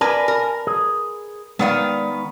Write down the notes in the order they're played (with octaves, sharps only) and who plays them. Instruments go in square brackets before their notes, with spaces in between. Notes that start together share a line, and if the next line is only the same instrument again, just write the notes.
[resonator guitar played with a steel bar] A#4 B4 D5 [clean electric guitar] G#5 A5
[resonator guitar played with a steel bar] A#4
[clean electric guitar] G#4
[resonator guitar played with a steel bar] D#3 B3 F5 [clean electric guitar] G#3 D5